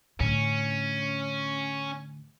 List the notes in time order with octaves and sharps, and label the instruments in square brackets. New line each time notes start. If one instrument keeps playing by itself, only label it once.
[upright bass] A2 D3 [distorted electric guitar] C#4